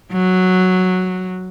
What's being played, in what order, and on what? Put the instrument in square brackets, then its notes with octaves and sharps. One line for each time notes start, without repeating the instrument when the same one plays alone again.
[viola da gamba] F#3